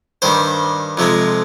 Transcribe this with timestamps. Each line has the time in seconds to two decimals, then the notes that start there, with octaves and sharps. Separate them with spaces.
0.22 G2 D#3 G3 C5
0.97 F2 C3 F3 G#3